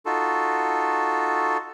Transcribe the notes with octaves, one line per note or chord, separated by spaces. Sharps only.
D#4 F4 F#4 A4